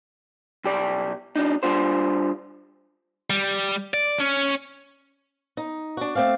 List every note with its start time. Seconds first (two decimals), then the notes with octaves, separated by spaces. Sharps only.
0.64 B1 G4 D5
1.36 F#3 D4 D#4
1.63 G3 D4 F4 C5
3.30 G3
3.94 D5
4.20 C#4
5.57 D#4
5.97 D4 F#4
6.15 A3 C4 D5 F5